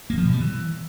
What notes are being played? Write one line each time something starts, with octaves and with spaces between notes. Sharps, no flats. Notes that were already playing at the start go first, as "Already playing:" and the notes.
A#3
F3
B2
G3
E3